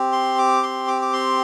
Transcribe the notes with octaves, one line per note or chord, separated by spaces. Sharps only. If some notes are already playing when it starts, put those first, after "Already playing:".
Already playing: C4 G4
C6
D6
C6
D6
D6
C6